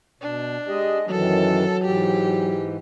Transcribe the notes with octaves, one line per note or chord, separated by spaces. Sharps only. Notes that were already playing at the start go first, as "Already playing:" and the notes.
B2 D4
G#3 G4 D#5
F#2 D#3 E3 F#3 A4
G#2 E3 G4